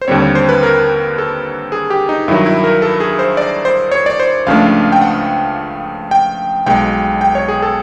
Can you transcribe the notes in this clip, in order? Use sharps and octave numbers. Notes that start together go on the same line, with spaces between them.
C5
D#2 D3 G3 C4 C#5
C#5
C5
B4
A#4
A4
G#4
G4
D#4
G2 D#3 F#3 E4
E4
A#4
A4
G#4
C5
D5
C5
C#5
D5
C5
C#2 C#3 F3 A3 D4 F5
G5
F#5
G5
B1 B2 G#3 G5
G5
C#5
G#4
A4